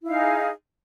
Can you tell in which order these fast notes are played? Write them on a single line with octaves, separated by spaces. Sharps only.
E4 F5 D#4 G#4